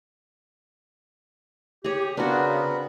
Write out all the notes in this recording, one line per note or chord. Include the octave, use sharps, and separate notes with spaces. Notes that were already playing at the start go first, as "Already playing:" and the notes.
G4 G#4 C#5
C#3 B3 C4 D4 F#4 A#4 B4